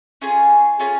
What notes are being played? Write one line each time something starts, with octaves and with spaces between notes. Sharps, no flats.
C#4 F4 G#4
C#4 F4 G#4